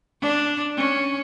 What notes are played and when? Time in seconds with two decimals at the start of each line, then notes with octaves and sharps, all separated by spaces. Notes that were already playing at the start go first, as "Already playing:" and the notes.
0.21 D4
0.77 C#4